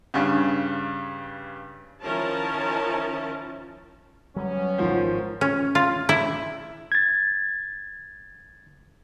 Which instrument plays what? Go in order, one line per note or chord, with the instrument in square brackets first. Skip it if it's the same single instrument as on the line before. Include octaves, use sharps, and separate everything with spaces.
[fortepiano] G2 C#3
[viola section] D#3 F3 C#4 E4 A#4 A5
[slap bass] F#3 G3 [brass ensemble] B3 C#4
[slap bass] G#1 G#3 [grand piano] D#3 F3 C5
[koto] C#4
F4
E4
[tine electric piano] G#6 A6